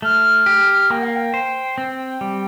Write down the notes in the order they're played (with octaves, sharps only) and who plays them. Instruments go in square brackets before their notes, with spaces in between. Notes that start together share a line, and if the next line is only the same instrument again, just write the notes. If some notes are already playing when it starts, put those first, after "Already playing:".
[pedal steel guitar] A3 [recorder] F6
[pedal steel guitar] G4
[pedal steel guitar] A#3 [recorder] G5
[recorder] F5
G5
[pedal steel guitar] C5
C4
G3